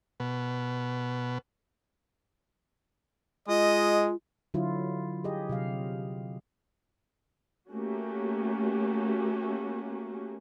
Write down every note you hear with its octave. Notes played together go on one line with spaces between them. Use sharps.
B2
G#3 F4 D#5
D3 F#3 E4 F4
G4 G#4 D#5
C3 F#3 F5
A3 A#3 C#4 F#4 G4